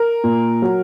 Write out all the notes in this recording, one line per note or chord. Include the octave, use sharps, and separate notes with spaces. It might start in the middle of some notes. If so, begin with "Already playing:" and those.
Already playing: A#4
A#2
F#3